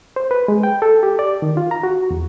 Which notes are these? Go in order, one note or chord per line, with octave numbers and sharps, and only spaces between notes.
C5
B4
G#3
G5
A4
G4
D5
D#3
F4
A#5
F#4
E2